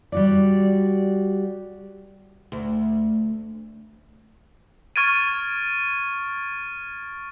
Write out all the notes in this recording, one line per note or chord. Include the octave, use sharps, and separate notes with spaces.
G3 F#4 D5
D2
C#6 F6 G#6 A6 D7 D#7